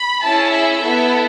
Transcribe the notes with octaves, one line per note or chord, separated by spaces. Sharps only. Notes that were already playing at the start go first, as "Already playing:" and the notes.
Already playing: B5
C#4 E4 G#4 A5
E5
B3 E4 A4